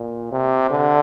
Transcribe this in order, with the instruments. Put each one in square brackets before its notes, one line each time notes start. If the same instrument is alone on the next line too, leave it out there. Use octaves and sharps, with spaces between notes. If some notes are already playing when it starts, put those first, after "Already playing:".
Already playing: [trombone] A#2
C3
D3